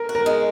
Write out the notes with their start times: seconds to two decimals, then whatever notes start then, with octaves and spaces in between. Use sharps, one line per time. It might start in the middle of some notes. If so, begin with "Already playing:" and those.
Already playing: A#4
0.09 F#4
0.15 A#4
0.26 G#3